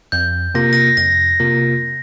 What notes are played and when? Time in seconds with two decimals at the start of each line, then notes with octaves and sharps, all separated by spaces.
0.12 F2 G6
0.55 C3 A#3 F4 A#4 A#6
0.73 A#6
0.97 F2 A#6
1.40 C3 A#3 F4 A#4